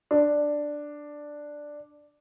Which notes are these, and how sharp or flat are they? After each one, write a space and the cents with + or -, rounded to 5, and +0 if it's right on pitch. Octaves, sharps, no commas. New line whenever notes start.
D4 +5